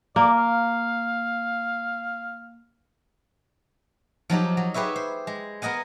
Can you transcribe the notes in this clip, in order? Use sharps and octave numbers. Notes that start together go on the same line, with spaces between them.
A#3 D5
F5
F3 F#3 D#4 G4
F#3
G4 G#4 B4 C#5 E5
C5
G#3
B3 A#4 D#5 F#5 G#5